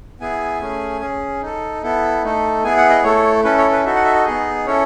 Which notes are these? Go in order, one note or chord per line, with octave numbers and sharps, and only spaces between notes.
B3 E4 G#4 G#5
A3 C#4 G#4
C#4 G#4
D#4 A4
B3 E4 A4
A3 D#4 A4
B3 E4 G#4 G#5
F#5
D#5
A3 E4 A4 C#5
C#4 E4 A4 B4
C#5
B4
D#4 F#4 A4 E5
F#5
E5
D#5
B3 D#4 G#4
C#4 E4 A4 C#5